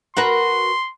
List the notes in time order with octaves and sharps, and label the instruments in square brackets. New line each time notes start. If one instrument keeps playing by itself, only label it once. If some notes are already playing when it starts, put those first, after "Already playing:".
[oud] F#4 A#4 B4 [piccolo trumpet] C6